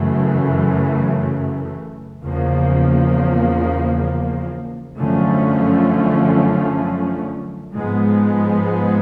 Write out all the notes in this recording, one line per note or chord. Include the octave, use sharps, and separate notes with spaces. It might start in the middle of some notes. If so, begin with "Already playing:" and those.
Already playing: F#2 C#3 E3 A3
E2 C#3 F3 A#3
F#2 D3 F3 A3 C#4
G#2 F3 G#3 B3